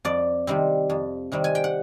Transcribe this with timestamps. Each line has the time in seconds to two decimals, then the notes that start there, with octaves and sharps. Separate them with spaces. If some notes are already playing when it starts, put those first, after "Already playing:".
0.05 F2 D5
0.47 C3 D#3 G3 C4
0.90 F2
1.32 C3 D#3 G3 C4
1.44 G#5
1.55 G5
1.64 F#5